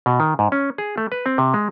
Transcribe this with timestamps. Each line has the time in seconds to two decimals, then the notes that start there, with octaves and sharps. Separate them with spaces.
0.06 B2
0.20 D#3
0.39 G#2
0.52 C#4
0.78 G#4
0.98 A3
1.12 B4
1.26 C4
1.38 C3
1.54 G#3